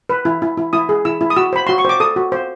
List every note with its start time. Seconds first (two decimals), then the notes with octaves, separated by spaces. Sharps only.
0.09 B4
0.25 E4
0.42 E4
0.57 E4
0.73 E4 D#6
0.89 G#4
1.05 E4 E6
1.21 E4
1.30 D#6
1.36 F#4 E6
1.53 C5 B5
1.67 F#4 C6
1.78 C#6
1.85 C5 D6
2.00 A4 D#6
2.16 F#4
2.32 C5